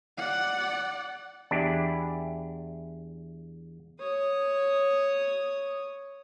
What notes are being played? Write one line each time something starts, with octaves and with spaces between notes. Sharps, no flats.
D5 F#5
E2 D4 E4 G4 B4
C#5 D#6